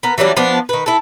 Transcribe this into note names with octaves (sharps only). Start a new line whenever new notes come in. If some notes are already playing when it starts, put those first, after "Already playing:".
B3 A#4
E3 F#3 G3 D4
F3 B3 D4
D#3 B4
E4 A4